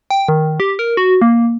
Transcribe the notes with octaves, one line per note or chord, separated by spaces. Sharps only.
G5
D#3
G4
A#4
F#4
A#3